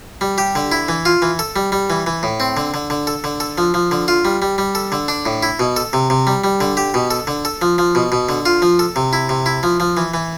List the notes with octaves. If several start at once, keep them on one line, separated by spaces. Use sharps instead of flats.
G3
G4
D3
E4
E3
F4
E3
A4
G3
G3
E3
E3
A2
C4
D3
D3
D3
A4
D3
A4
F3
F3
D3
F4
G3
G3
G3
A4
D3
D4
A2
E4
B2
A4
C3
C3
G3
G3
D3
G4
B2
A4
D3
A4
F3
F3
B2
B2
D3
F4
F3
A4
C3
E4
C3
E4
F3
F3
E3
E3